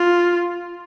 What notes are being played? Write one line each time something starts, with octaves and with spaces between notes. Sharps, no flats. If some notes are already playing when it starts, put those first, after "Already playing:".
Already playing: F4